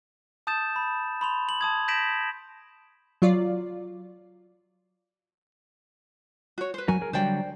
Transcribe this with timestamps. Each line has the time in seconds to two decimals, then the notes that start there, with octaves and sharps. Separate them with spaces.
0.47 A5 D#6 G6 A6 E7
0.76 B5
1.21 B5 C6 F7
1.49 F#7
1.61 A5 D#6 G#6
1.88 G6 A#6 B6 D7 E7 F#7
3.22 F#3 F4 D5
6.58 F#4 C#5
6.74 B4 C5
6.88 F#3 F#4 A#4 G#5
7.01 G#4 A#4
7.13 D3 F#3 G3 C5 D5 G5